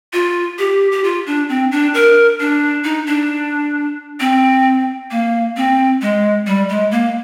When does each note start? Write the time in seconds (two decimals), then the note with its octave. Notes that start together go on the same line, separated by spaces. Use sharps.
0.13 F4
0.59 G4
0.92 G4
1.04 F4
1.27 D4
1.49 C4
1.72 D4
1.94 A#4
2.40 D4
2.84 D#4
3.07 D4
4.20 C4
5.11 A#3
5.57 C4
6.02 G#3
6.47 G3
6.69 G#3
6.91 A#3